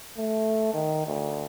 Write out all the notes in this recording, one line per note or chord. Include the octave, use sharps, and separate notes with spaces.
A3
D#3
D2